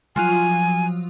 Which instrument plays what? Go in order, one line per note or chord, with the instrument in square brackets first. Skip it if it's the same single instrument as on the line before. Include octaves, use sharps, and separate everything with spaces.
[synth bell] F3 F#3 F4 [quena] G#5